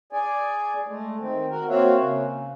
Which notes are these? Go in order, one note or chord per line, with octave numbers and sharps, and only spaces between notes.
G#4 D5 G#5
G#3 A3
D#3 C4
F#4 A#4
A#3 C4 F#4 C#5 E5 F5
C#3